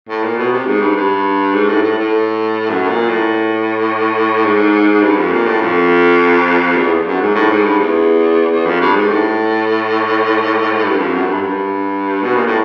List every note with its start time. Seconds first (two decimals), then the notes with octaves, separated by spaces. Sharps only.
0.09 A2
0.23 A#2
0.38 B2
0.52 C3
0.66 G#2
0.81 G2
0.96 G2
1.54 G#2
1.69 A2
1.83 A2
1.98 A2
2.70 F#2
2.89 A#2
3.09 A2
4.44 G#2
5.02 G2
5.18 F2
5.32 A#2
5.46 A2
5.61 F2
6.76 E2
7.07 F#2
7.21 G#2
7.35 A2
7.50 G#2
7.64 G2
7.79 E2
8.51 E2
8.66 F2
8.81 G2
8.95 G#2
9.10 A2
10.83 G2
10.98 F2
11.13 F#2
11.27 G2
11.42 G2
12.23 B2
12.35 A#2
12.47 A2